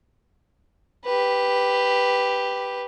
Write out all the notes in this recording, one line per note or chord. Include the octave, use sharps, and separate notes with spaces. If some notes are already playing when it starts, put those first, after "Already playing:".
G4 B4